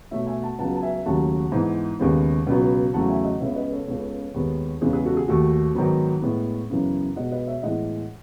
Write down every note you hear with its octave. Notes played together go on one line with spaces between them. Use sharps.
B2 A3 C#5 E5
E5 G#5
F#5 A5
C#2 C#3 F#3 B3 F#5 A5
A5
E5 G#5
D#2 C#3 F#3 A3 F#5 A5
G#2 E3 B3
D#2 C#3 G#3 B3
C#2 B2 F#3 B3
E2 C#3 F#3 A3 F#5 A5
E5 G#5
D#5 F#5
C#2 C#3 G#3 B3 C#5 E5
B4 D#5
A4 C#5
C#2 C#3 G#3 B3 A4 C#5
D#2 D#3 G#3 B3
E2 C#3 G#3 B3 G#4 B4
G#4 B4
F#4 A4
G#4
D#2 D#3 A3 F#4 A4
G#2 D#3 F#3 B3
A2 G#3 B3
F#2 C#3 E3 B3
B2 G#3 B3 D#5 F#5
B4 D#5
C#5 E5
A2 E3 G#3 B3 D#5 F#5